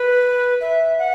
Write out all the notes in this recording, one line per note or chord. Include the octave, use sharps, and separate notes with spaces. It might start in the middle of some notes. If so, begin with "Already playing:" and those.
Already playing: B4
E5
F#5